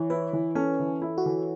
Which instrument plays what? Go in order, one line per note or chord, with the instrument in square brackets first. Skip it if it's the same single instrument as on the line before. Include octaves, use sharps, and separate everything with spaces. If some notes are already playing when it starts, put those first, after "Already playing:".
Already playing: [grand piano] E3 [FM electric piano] C#5
[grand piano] E4 [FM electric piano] B4
[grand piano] E3
[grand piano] C#4 [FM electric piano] A4
[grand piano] E3
E4
[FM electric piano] F#4
[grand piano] E3